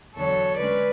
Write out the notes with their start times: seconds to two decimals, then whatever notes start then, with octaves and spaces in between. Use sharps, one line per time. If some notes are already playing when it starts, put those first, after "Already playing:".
0.16 E2 D3 F#3 A4 C#5
0.58 D3 G#3 C#4 B4 D5